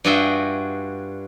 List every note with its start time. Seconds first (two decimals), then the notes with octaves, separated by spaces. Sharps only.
0.05 G2 F4 F#4 G#4 E5 G5